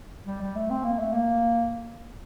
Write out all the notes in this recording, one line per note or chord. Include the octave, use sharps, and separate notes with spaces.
G3
G3
A3
C4
A#3
A3
A#3